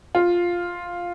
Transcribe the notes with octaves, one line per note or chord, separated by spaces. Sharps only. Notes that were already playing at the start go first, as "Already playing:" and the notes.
F4